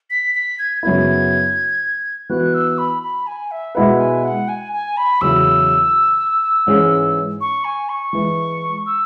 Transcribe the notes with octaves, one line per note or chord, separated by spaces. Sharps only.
B6
B6
G#6
F#2 C#3 F#3 B3 E4 G#6
E3 B3 F#4 B4 F#6
E6
B5
B5
G#5
E5
B2 G#3 E4 B4 F#5
G#5
F#5
G#5
G#5
B5
E2 C#3 F#3 C#4 E4 E6
G#2 E3 C#4 G#4
C#6
G#5
C#6
E3 G#3 E4 B4
E6